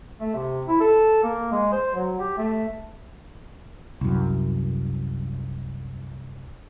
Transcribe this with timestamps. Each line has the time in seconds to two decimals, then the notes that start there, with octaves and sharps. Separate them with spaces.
0.20 A3
0.35 C3
0.68 E4
0.80 A4
1.24 A#3
1.52 G#3
1.72 C5
1.95 F#3
2.19 G4
2.37 A3
4.01 C2 F#2